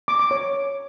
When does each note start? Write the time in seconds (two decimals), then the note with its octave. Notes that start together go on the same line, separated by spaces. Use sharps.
0.08 D6
0.19 D6
0.31 C#5